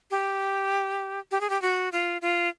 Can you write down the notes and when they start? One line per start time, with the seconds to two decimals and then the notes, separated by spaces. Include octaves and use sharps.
0.11 G4
1.31 G4
1.41 G#4
1.50 G4
1.62 F#4
1.92 F4
2.22 F4